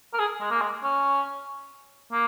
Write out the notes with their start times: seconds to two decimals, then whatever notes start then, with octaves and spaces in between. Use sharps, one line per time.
0.14 A#4
0.19 G#4
0.40 G#3
0.51 A#3
0.61 G#3
0.83 C#4
2.12 A#3